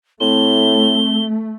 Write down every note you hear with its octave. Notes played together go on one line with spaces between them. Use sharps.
A2 A3 C4 G7